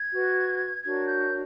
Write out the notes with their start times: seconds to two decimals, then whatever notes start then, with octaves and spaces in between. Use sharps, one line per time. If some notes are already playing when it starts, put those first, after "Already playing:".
Already playing: G#6
0.11 F#4 B4
0.84 D4 F#4 A#4 C#5 G#6
1.08 G6